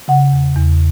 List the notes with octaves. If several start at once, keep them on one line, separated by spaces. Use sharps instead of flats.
C#3 F#5
E2
E2